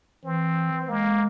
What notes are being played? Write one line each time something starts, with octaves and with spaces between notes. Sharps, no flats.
E3 C4
G#3 A#3